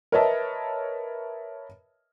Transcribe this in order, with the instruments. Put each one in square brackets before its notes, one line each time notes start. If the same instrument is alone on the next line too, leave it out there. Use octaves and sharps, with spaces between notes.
[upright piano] A#4 B4 C#5 D#5 E5 A5